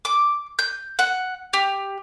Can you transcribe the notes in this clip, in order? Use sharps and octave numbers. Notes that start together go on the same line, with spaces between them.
D6
G6
F#5
G4